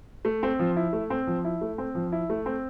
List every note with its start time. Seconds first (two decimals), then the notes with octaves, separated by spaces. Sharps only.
0.25 A3
0.43 C4
0.59 F3
0.76 E4
0.93 A3
1.10 C4
1.27 F3
1.44 E4
1.61 A3
1.78 C4
1.95 F3
2.12 E4
2.30 A3
2.46 C4